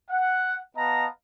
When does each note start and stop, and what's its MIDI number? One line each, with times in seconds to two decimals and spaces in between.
0.10 0.57 78
0.76 1.06 59
0.76 1.06 75
0.76 1.06 77
0.76 1.06 81
0.76 1.06 82